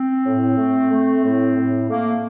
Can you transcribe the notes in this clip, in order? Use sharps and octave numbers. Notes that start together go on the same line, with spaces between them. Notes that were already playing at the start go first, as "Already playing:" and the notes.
Already playing: C4
A2
A3
A3
A2
A2
A3 A#3